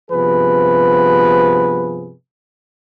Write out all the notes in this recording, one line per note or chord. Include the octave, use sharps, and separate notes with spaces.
G2 C3 F3 B3 G#4 B4